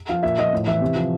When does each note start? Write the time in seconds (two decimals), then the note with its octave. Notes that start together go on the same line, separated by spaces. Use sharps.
0.09 F3 F5
0.23 A#2 E5
0.39 F3 D#5
0.53 A2
0.67 E3 E5
0.81 C3
0.96 F3